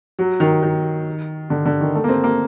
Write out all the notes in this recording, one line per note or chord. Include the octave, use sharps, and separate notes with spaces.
F#3
D#3
D#3
D3
D3
D#3
A3
A#3
C4
A#3